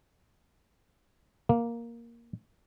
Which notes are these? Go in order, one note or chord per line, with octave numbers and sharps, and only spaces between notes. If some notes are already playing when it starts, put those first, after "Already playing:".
A#3